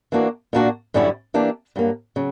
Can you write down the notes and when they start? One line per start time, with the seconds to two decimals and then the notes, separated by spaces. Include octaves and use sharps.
0.12 E3 A#3 D4 F#4
0.53 A#2 A#3 D4 F#4
0.94 F#2 D3 G3 C#4 E4
1.34 E3 A#3 D4 G4
1.76 G2 F#3 A#3
2.16 C#3 F#3